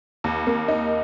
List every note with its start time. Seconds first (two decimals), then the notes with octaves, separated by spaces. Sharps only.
0.24 D#2
0.47 A#3
0.68 D#4